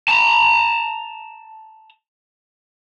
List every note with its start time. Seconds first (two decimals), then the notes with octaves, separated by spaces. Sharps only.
0.09 A5 A#5